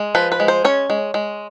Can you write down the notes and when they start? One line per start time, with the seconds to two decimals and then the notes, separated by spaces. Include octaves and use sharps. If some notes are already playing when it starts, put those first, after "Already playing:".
Already playing: G#3
0.15 F3 B4
0.32 B4
0.40 G#3
0.48 C5
0.65 C#4 C#5
0.90 G#3
1.14 G#3